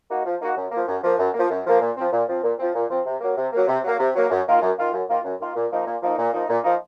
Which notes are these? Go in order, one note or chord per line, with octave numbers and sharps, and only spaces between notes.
A#3 D#4 F#4
F3
A#3 D#4 F#4
F#2
F3 A#3
F#2
F3 A#3
F#2
F3 A#3
F#2
F3 A#3
A#2
F3 C4
A#2
F3 C4
A#2
F3 C4
A#2
F3 C4
C3
F#3 A#3
C3
F#3 A#3
C3
F#3 A#3
C3
F#3 A#3
F#2
D#3 A#3 F4
F#2
D#3 A#3 F4
F#2
D#3 A#3 F4
F#2
D#3 A#3 F4
A#2
F3 A#3 D#4
A#2
F3 A#3 D#4
A#2
F3 A#3 D#4
A#2
F3 A#3 D#4